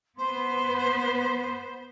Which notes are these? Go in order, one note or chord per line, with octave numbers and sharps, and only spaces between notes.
B3 B4 C5 C6